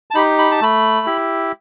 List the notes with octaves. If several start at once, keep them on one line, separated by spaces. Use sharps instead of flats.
A5
D#4 G4 B5
B5
A5
A3 B5
E4 G4